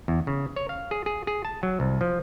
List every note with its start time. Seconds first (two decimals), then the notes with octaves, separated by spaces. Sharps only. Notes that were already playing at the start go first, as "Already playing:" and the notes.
0.08 E2
0.27 C#3
0.56 C#5
0.69 F5
0.91 G#4
1.06 G#4
1.27 G#4
1.45 A5
1.63 F#3
1.80 C2
2.01 F3